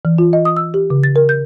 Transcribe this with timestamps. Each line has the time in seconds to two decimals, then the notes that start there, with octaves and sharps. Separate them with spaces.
0.05 E3
0.18 F4
0.33 D#5
0.45 D#6
0.57 E6
0.74 G4
0.90 C#3
1.04 A6
1.16 A#4
1.29 G6